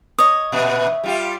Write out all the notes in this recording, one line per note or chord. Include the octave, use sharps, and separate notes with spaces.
C#5 D#5 D#6
A#2 B3 E5
G3 F4 G4